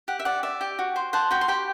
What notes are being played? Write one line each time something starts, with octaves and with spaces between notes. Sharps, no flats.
G4 F#5
E5
D5 F#5
D5 E5
G4
F#4
C5
C5 F#5 A5
F#4 G5 B5
C6
G4 G5 B5